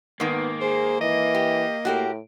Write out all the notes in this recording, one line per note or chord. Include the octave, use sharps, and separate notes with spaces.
G#2 D#3 A#3 B3
G#4 C5
E3 D#5
G4
A2 F#4 G4 A#4